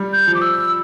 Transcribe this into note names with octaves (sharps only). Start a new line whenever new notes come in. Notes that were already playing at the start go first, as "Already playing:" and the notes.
Already playing: G3
G6
F3
D6
E6